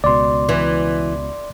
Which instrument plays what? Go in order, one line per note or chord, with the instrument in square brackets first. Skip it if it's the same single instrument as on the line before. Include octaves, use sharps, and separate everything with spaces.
[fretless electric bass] C#2 B2 [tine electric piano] D5 C6
[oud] E3